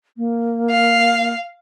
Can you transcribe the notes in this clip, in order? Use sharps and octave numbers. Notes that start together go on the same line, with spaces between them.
A#3
F5